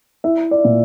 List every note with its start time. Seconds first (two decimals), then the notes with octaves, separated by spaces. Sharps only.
0.24 E4 E5
0.51 D5
0.65 A#2